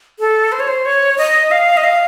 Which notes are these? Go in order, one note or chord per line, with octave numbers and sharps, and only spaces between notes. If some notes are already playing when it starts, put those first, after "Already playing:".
A4
C5
C#5
C5
C#5
D#5
F5
D#5
F5